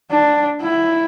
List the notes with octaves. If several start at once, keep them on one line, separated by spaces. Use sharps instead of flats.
D4
E4